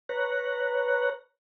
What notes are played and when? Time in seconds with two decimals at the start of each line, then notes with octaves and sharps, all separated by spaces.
0.09 B4 C#5 A#5 F#6